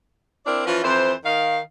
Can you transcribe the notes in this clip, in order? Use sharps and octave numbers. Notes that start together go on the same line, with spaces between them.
C4 D4 E4 A#4 D5
E3 F3 C#4 F4
F2 E3 C5
D#3 F5